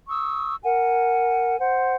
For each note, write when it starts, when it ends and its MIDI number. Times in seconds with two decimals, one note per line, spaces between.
0.08 0.56 85
0.08 0.56 87
0.08 0.56 88
0.64 1.58 70
0.64 1.58 78
0.64 1.58 80
1.59 1.94 72
1.59 1.94 78